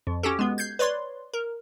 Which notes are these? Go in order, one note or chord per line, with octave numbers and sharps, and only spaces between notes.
F2
C#4 F#4 G4 A4
G#3 B3
G6 G#6 C7
B4 C#5 D5 C6
A#4